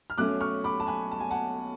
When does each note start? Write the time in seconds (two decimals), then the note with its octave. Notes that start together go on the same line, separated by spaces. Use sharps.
0.10 F6
0.18 B1 B2 A3 C#4 D6 F#6
0.41 C#6 F6
0.64 B5 D6
0.80 A5
0.87 G#5 B5
1.12 A5
1.20 G#5
1.30 F#5 A5